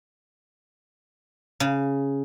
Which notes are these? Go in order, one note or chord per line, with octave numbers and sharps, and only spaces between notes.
C#3